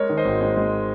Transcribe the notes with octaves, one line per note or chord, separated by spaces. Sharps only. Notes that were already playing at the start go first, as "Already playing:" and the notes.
Already playing: G#3 A#4 C#5
D#3
C5 D#5
G#1
G#3
G#3